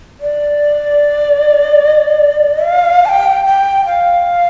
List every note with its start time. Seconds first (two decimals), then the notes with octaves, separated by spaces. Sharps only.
0.21 D5
2.64 F5
3.06 A5
3.09 G5
3.45 G5
3.86 F5